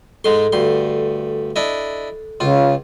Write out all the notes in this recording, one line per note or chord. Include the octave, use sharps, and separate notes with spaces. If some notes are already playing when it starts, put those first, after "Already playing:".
G#2 G#3 A4 C6
D2 G2 C6
D4 E4 D#5
C#2 C#3 F4